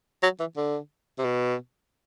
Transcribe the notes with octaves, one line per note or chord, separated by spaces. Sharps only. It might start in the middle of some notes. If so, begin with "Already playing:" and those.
F#3
E3
D3
C3
B2